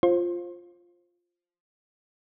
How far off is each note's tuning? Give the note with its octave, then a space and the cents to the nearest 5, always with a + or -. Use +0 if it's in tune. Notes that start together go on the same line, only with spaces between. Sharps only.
F4 +0 C5 +20